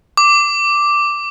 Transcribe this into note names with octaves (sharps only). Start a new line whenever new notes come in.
D6